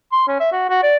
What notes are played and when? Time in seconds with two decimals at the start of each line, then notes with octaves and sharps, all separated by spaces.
0.12 C6
0.28 C#4
0.40 E5
0.52 F#4
0.70 F#4
0.83 D5